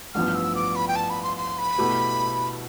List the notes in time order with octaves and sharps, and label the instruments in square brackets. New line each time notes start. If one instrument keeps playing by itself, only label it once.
[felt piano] A1 G2 F3 B3 [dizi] F6
[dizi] E6
D6
B5
G5
A5
B5
C6
C6
B5
[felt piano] B2 A3 E4 G4 B4